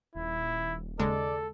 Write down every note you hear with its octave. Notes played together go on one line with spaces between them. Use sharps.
D#1 E4
D#2 C#3 G#3 A4 D5